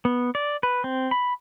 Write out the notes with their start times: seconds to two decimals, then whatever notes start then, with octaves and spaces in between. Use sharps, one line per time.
0.05 B3
0.35 D5
0.63 B4
0.84 C4
1.11 B5